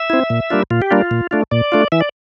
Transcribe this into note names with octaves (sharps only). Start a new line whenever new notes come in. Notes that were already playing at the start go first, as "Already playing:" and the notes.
Already playing: E5
C4 E4
A#2
G3 A#3 D4 F4
A#2 F4
G4
G3 A#3 D4 F4
A#2
A3 D4 F4
A#2 D5
A3 D4 F4
E3 E5
D5